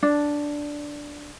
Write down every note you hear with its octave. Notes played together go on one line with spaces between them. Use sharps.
D4